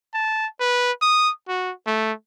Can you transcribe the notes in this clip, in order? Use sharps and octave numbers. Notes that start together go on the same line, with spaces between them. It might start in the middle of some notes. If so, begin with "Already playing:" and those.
A5
B4
D#6
F#4
A3